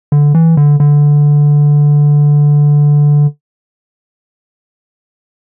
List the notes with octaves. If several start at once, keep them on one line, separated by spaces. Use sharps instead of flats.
D3
E3
D3
D3